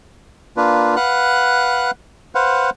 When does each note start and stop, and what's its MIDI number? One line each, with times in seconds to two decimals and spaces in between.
0.57 0.96 58
0.57 0.96 62
0.57 0.96 65
0.57 0.96 71
0.96 1.91 71
0.96 1.91 77
0.96 1.91 78
0.96 1.91 90
2.35 2.70 71
2.35 2.70 72
2.35 2.70 77
2.35 2.70 78